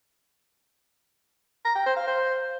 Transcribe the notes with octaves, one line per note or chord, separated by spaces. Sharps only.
A#5
G5
C5
F5
C5